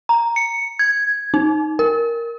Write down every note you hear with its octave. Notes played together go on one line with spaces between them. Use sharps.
A#5
C#7
G#6
D#4
A#4